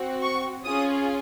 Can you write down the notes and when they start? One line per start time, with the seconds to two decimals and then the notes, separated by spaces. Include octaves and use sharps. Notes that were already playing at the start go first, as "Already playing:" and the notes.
Already playing: C4 F#4
0.23 C#6
0.65 C#4 F4 G#4 D#6